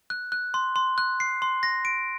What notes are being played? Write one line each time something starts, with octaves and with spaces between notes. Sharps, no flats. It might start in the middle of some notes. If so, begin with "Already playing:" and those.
F#6
F#6
C6
C6
F#6
C7
C6
A#6
D7